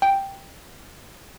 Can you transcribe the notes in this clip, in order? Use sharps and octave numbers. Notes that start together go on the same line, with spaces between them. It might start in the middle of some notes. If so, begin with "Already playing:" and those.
G5